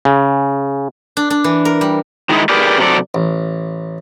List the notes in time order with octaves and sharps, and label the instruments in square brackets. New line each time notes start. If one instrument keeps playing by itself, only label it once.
[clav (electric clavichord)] C#3
[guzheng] D4
D4
E3
A#4
G3
[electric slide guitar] D#3 G#3 D#4 E4
G4 G#4 A#4 B4 D5
C3 F#3 C4 A4 D5
[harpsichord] A1